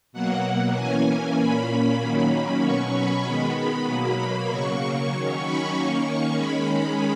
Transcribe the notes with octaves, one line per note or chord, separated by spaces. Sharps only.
B2 F#3 A#3 F#5
E3 A#3 C#4 G#5
A#2 A#3 C#4 B5
D#3 F#3 A#3 C#4 B5
B2 F#3 C#4 C#6
B5
D#3 G#3 B3
B2 F#3 A#3 B5
C#3 F#3 A#3 C#6
C#6
D#3 F#3 C#4
B5
D#3 A#3 C#4 C#6
D#3 G#3 C#4 B5